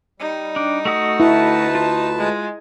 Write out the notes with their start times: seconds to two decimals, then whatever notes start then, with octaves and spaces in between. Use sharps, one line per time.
0.20 G3 D#4
0.56 D4
0.85 A3 F#4 D#6
1.20 D2 E4 B4 A5
1.75 F4
2.18 G#3